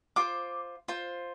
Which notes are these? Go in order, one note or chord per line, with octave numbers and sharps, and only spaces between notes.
F4 C5 D6
F4 C5